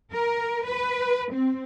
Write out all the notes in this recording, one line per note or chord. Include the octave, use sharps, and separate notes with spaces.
A#4
B4
C4